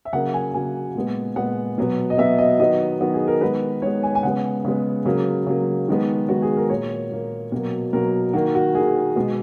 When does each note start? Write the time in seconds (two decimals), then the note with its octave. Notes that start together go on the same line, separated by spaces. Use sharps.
0.05 E5
0.13 C#3 F#3 A#3 F#5
0.34 G#5
0.54 C#3 F#3 A#3 G#5
0.95 A#2 G#3 B3
1.36 A#2 G#3 B3 F#5
1.78 B2 F#3 B3
2.10 D#5
2.18 B2 F#3 B3 E5
2.38 D#5
2.59 D#3 F#3 B3 D#5
3.00 D#3 F#3 B3 F#4
3.14 G#4
3.27 A#4
3.41 D#3 G#3 B3 B4
3.82 D#3 G#3 B3 C#5
4.03 G#5
4.15 G#5
4.23 C#3 G#3 B3 F#5
4.65 C#3 G#3 B3
5.05 C#3 F#3 A#3
5.47 C#3 F#3 A#3
5.88 D#3 G#3 B3
6.29 D#3 G#3 B3 F#4
6.42 G#4
6.57 A#4
6.70 A#2 A#3 C#5
7.11 A#2 A#3
7.52 B2 F#3 A#3
7.93 B2 F#3 A#3 A#4
8.33 D#3 A#3 F#4
8.55 F#4
8.74 D#3 A#3 G#4
9.16 B2 G#3 B3